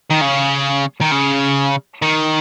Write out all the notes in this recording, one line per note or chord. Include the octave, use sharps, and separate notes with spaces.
D#3
C#3
D#3
C#3
D#3